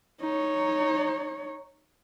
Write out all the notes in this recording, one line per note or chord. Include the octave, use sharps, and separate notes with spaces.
D#4 C#5